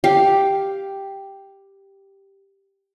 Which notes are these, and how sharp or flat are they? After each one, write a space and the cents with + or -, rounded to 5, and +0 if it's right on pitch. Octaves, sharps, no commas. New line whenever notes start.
G4 +0 F5 +0